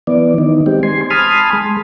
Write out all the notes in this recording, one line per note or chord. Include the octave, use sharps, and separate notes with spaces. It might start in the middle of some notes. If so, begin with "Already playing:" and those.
E3 B3 D5
D#3 D#4
G#3 C4 G4
G#5 C6
G#5 A5 B5 C6 D#6 F6
G#3